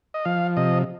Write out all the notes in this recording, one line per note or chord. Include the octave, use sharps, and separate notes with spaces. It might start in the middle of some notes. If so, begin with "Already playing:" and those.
D#5
F3 F5
C3 D#5